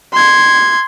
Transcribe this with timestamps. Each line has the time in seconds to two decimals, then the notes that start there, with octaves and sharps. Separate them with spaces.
0.13 C6 G#6